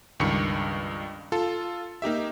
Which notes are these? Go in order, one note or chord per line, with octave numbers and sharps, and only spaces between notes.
C#2 G2 D#3 C#6 C#7
F4 A4
A#3 D#4 G4 E5